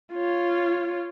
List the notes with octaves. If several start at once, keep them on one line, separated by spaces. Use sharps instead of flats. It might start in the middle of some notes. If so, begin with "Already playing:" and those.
F4 C#5